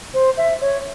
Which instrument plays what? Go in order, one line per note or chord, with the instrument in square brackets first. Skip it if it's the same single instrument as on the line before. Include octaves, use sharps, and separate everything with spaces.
[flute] C5
E5
C#5